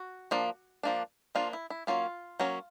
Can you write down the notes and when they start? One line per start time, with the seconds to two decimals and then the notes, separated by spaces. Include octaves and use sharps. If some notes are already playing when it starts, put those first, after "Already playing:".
Already playing: F#4
0.31 F3 A#3 D4
0.83 F3 A#3 D4
1.35 F3 A#3 D4 F4
1.53 E4
1.70 E4
1.87 F#3 A#3 C#4 F4
2.40 F#3 A#3 C#4